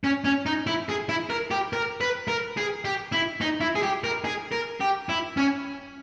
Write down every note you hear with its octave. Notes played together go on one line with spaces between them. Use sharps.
C#4
C#4
D#4
E4
G#4
E4
A#4
G4
A#4
B4
A#4
G#4
G4
E4
D#4
E4
G#4
G4
A#4
G#4
A#4
G4
E4
C#4